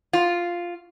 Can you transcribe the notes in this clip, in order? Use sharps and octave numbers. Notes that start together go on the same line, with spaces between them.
F4